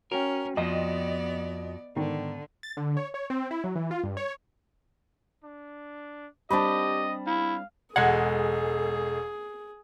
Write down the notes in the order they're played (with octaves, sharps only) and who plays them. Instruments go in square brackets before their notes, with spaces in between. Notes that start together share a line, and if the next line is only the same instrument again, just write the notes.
[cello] C#4 [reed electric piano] F#4 G5 [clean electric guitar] A#4
[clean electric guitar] F2 F3 [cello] B3 D5 [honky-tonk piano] D#5
[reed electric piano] G#2 B3 [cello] D3 [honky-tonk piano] D#3
[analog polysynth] A6
D3
C#5
C#5
C4
E4
F#3
E3
F4
G2
C#5
[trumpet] D4
[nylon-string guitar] G3 C4 D4 [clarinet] G4 [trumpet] D#5 [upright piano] A5 B5
[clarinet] E4 [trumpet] F5
[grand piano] E1 G#3 G#6 [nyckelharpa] G#4 [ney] A4 [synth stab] F#5